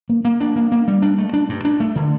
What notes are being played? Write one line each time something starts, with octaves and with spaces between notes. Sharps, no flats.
A#3
A#3
D4
A#3
A#3
G3
D4
A3
D4
G2
D4
A3
D3